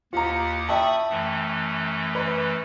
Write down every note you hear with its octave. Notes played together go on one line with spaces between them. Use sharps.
D#2 F4 G4 F#5 A#5
E5 G5 A5 B5 C#6 D#6
F#2 E3 A3
B4